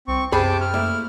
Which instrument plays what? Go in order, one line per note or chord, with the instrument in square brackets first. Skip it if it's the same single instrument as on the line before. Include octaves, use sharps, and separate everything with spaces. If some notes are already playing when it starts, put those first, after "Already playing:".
[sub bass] C2 [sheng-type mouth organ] C4 C#6
[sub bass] F#2 [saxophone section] C3 [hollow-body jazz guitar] G#4 B5 [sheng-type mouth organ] G5 A5 D6
[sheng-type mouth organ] F6
[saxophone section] A3 E4 [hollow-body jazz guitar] A#3